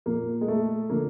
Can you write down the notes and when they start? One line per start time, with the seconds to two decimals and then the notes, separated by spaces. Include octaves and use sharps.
0.06 A#2 F3 A#3
0.41 G#3
0.48 A3
0.90 D3 F3 A#3